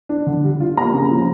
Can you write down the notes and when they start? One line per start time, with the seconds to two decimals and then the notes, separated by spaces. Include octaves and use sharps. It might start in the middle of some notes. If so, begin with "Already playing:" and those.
0.09 D4
0.27 D3
0.44 G3
0.60 F4
0.77 A#3 A#5
0.94 C#3
1.11 F3